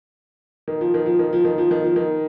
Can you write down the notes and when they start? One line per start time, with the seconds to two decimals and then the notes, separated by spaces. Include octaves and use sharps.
0.68 D#3
0.81 F3
0.94 D#3
1.06 F3
1.19 D#3
1.33 F3
1.45 D#3
1.58 F3
1.71 D#3
1.84 F3
1.96 D#3